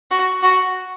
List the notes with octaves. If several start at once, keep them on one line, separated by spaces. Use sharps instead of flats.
F#4
F#4